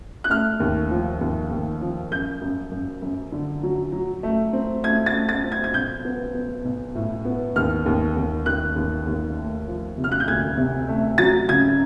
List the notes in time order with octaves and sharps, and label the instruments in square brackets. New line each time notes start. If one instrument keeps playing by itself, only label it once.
[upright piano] F#6
A3 F6
D#2
F3
D#2
D#2
F3
F#2 G6
F#2
F#2
F#2
D3
F#3
F#3
A3
C4
A3 G#6
A6
A3
A6
C4
G#6
G#6
B1 G6
B3
B3
B1
A2
B3
D#2 F6
D#2
D#2
D#2 F#6
D#2
D#2
A3
F3
C3
F6
F#6
G6
D2 G#6
C3
A3
F#3 A6
C#3 G#6